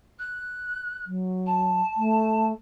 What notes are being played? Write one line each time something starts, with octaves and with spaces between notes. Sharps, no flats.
F#6
F#3
A5
A3